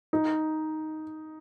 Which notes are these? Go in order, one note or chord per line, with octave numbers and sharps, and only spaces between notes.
D#4